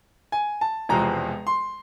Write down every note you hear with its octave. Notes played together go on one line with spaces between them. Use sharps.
G#5
A5
E1 E2 C3 F3 G#3 A#5
C6